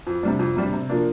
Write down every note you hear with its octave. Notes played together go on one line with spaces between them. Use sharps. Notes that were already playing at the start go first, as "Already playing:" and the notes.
F2
C3 G3 D4
F2
C3 G3 D4
C3
F3 A#3 D4